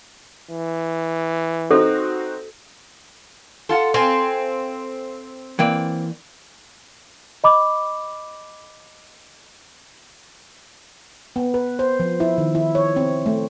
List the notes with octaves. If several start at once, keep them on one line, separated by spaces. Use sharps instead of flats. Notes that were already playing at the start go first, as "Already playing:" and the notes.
E3
C4 D#4 F#4 A4
F4 A4 F#5 A5 C6
C4 F5 G#5 C6
E3 A#3 C4 D5 G5
D#5 B5 D6
B3
B4
C5
F3
E4
D#3
E4
C#5
C4
A3